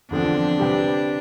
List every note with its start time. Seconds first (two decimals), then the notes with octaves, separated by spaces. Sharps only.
0.11 E2 D3 F3 C4 D4
0.59 C3 G3 C4 G4 B4